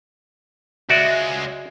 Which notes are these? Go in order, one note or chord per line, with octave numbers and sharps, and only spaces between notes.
C#2 G#3 F#4 D5 E5 F6